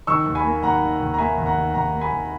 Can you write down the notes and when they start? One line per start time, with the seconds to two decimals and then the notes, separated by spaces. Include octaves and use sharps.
0.07 D#3 C#6 E6
0.26 D#2
0.35 G#5 B5
0.44 A#3
0.63 D#2 F#5 A#5
0.81 D#3
1.00 D#2
1.14 A#5
1.18 A#3 E5 G#5
1.37 D#2
1.46 F#5 A#5
1.55 D#3
1.74 D#2 F#5 A#5
1.92 A#3
2.01 G#5 B5
2.10 D#2